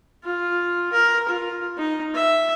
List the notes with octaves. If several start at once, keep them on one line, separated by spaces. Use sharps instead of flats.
F4
A#4
F4
D#4
E5